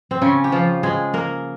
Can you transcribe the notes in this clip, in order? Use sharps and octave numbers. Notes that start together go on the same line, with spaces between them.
C4
C#3 C#4
G4
F3 F4
G#3 G#4
A#3 A#4